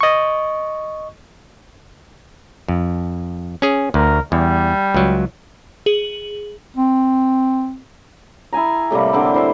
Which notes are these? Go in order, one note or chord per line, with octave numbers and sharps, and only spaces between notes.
D#5 C#6
F2
C#4 G#4
D2 A#4
E2 G3
C#2 F#3
G#4 F#7
C4
E4 G#4 G#5 A#5
A2 C3 G3 A#3
D3 C4 D6
E4 C5 E5